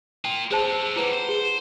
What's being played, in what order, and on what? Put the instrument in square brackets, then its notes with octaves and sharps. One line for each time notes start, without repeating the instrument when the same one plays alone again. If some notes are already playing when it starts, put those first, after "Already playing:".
[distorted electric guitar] A#3 F4 [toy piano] G5 D#6
[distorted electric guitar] C4 A4 [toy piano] G#4 C5 A5
[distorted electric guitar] G3 A#3 [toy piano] E4 B4 F#5
[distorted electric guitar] C5
[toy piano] G#4